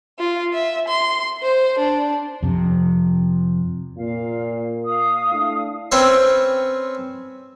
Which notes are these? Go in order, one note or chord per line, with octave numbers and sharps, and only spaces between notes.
F4
E5
C6
C5
D4
F2 C3
A#2 F5
F5 D#6
A3 D4 E4
C4 C#4 B4 C#5 E5 C6